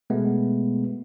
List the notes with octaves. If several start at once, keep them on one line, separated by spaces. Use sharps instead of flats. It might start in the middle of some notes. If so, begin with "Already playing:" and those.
B2 G#3 A3 B3